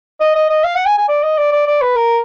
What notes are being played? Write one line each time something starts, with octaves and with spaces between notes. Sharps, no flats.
D#5
D#5
D#5
F5
F#5
G#5
G#5
D5
D#5
D5
D5
D5
B4
A#4